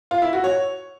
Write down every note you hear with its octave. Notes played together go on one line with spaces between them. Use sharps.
F4
E4
F#4
C#5